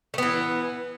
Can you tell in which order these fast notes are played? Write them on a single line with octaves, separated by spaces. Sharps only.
A3 B3 E3